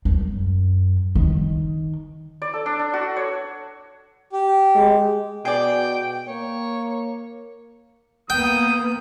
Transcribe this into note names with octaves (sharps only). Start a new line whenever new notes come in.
F#2
D#3
D5
A4
D4
D4
F#4
C#5
G4
G#3
B2 G#4 D5 G5
A#3 C#5
A#3 B3 G5 D#6